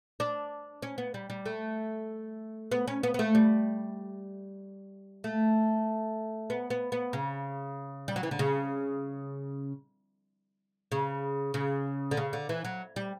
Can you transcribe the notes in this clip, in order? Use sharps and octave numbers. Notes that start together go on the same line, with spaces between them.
D4
C#4
B3
G3
G3
A3
B3
C#4
B3
B3
A3
G3
A3
B3
B3
B3
C#3
G3
F#3
E3
D3
C#3
C#3
C#3
D3
C#3
D3
E3
F#3
G3